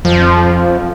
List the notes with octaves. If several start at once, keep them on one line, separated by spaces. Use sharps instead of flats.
F2 F3